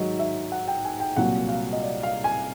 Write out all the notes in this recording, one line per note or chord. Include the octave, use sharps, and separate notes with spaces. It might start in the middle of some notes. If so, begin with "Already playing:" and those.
Already playing: G#2 D#3 F#3 D#5
E5
F#5
G5
G#5
G5
C2 A#2 F#3 F#5
F5
D#5
D5
F5
G#5